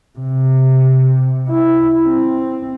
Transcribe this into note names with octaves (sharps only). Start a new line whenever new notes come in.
C3
E4
C4